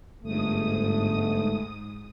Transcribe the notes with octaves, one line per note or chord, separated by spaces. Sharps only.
G1 G#2 A3 D#6